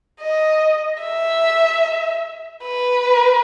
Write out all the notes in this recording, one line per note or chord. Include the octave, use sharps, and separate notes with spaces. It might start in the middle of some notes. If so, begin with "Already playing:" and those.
D#5
E5
B4